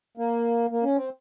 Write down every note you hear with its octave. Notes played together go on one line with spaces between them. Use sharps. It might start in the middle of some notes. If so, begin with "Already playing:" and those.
A#3
A#3
C#4
C4